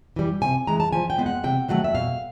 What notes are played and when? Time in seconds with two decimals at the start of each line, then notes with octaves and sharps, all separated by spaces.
0.16 E3 G3
0.42 C3 G#5
0.67 E3 G#3 A#5
0.80 A5
0.93 F3 G#5
1.10 G5
1.18 G#3 B3
1.26 F#5
1.44 C3 G5
1.68 D#3 F#3 A3 F#5
1.84 E5
1.95 B2 F5